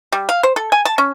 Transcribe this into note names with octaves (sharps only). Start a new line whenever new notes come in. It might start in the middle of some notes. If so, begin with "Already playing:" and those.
G3
F5
C5
A4
G#5
A5
C#4